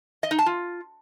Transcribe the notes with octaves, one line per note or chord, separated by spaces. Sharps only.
D#5
D#4
A5
F4